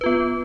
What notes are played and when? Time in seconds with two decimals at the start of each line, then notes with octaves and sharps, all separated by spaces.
0.01 B4
0.04 F4
0.06 B3